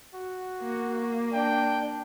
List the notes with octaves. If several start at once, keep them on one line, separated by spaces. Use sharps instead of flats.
F#4
A#3
D4 G5